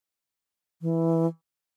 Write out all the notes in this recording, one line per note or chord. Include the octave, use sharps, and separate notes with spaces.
E3